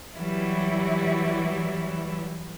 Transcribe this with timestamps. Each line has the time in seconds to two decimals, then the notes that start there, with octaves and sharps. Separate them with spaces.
0.16 E3 F#3 G3 E4